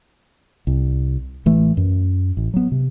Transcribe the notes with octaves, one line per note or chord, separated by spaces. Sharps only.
C2
A1 E3 A3
F#2
A1
F#3 B3
C3